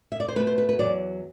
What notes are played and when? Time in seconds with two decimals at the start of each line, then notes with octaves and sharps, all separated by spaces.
0.12 E5
0.20 D5
0.28 C5
0.36 B2 A3 B4
0.47 C5
0.58 B4
0.69 B4
0.79 C3 F#3 D5
0.83 E2